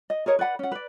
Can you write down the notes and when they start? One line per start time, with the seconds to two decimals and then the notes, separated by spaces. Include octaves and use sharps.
0.10 D#5
0.26 G#4 A#4 C#5 D#5
0.39 B4 D5 F#5 B5
0.59 C#4 F#5
0.72 B4 D5